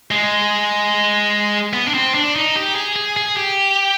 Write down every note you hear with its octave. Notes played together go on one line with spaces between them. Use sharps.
G#3
B3
D4
C4
D4
D#4
G4
G#4
G#4
G#4
G4